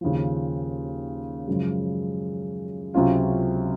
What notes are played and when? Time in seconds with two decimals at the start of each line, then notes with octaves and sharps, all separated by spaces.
0.01 D#2 C#3 F3
1.48 F#2 C#3 F3 G#3
2.94 C#2 C3 F#3 C#4 F4